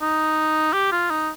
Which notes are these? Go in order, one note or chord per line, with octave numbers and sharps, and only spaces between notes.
D#4
G4
F4
D#4